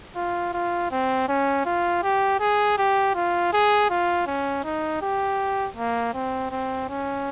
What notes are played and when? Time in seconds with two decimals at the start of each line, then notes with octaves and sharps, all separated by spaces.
0.16 F4
0.53 F4
0.91 C4
1.29 C#4
1.66 F4
2.03 G4
2.40 G#4
2.78 G4
3.15 F4
3.53 G#4
3.90 F4
4.27 C#4
4.64 D#4
5.01 G4
5.76 A#3
6.14 C4
6.51 C4
6.89 C#4